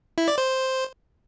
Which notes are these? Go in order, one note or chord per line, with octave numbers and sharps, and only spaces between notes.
E4
D5
C5